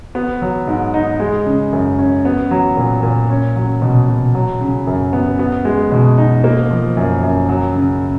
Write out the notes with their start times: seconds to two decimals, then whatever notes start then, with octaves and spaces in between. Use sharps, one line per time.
0.15 B3
0.42 F#3
0.67 G#2
0.94 D#4
1.20 G#3
1.46 C#3
1.72 F#2
1.98 C#4
2.25 B3
2.51 F#3
2.77 A#2
3.03 A#2
3.29 C#4
3.56 F#3
3.82 B2
4.08 B2
4.34 F#3
4.60 C#3
4.87 F#2
5.13 B3
5.39 B3
5.65 G#3
5.92 B2
6.18 D#4
6.44 A#3
6.70 F3
6.97 F#2
7.23 F#2
7.49 F#3
7.75 C#3